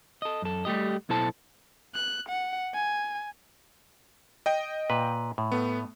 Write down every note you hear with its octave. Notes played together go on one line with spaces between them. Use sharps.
A4 D#5
F#2 A4
G3 A3 G4 D#5
B1 B2 E4 A4 C5 A5
F#6
F#5
G#5
D#5 G5
A#2 B4
A2
A3 B3